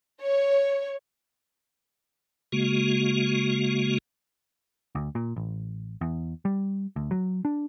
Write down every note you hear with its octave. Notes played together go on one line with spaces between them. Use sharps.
C#5
C#3 G#3 A#3 F#4
D2
A#2
A1
E2
G3
D2
F#3
D4